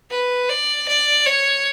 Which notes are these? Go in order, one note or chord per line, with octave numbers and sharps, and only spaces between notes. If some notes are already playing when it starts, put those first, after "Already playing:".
B4
D5
D5
C#5